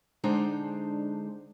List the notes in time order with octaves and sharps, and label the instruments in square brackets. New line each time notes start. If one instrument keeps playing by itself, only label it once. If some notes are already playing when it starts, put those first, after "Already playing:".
[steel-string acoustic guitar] D3 G#3 D4 D#4 C5 A#5